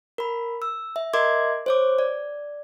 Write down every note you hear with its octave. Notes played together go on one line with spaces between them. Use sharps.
A#4 B5
E6
E5
A#4 D#5 E5 C6 D6 G#6
C5 C#5 D6
D5